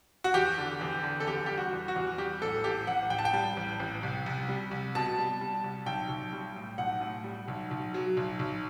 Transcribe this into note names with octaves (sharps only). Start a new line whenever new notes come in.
F#4
E2 G4
D3
E2
D3
A4
E2 G4
G3 G4
F#4
E2
F#4
E2
G3 G4
A1 A4
A1 G4
A1 F#5
A1 G5
A5
G5
G3
A1
A1
C2
C2
G3
C2
B2 A5
G3
G3
C2
B1 G5
B1
G3
A2
B1 F#5
A2
G3
B1
B1
F#3
B1
B1